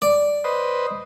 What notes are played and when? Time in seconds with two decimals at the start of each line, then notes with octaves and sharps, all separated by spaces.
0.02 D5
0.44 B4 C5 D#5